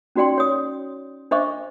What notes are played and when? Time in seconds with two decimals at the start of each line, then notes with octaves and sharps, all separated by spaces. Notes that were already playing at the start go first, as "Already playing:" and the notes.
0.16 C#4 D#4 F#4 D5 G5 C6
0.38 C#5 D#6
1.31 D4 C5 D#5 E5 C#6 D6